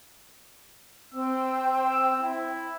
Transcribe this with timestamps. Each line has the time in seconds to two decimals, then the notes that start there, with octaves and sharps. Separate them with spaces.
1.14 C4 C5 G5 E6
2.21 E4